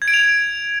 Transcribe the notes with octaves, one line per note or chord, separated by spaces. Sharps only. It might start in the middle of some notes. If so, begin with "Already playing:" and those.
G#6
D7
F7